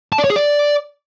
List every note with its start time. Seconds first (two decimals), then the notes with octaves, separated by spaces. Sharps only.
0.13 A5
0.18 D5
0.24 C#5
0.30 G#4
0.36 D5